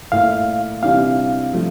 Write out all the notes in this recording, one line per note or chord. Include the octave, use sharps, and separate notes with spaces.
A#2 A3 E4 F5
C3 E3 G3 D4 G4 F5
F3 A3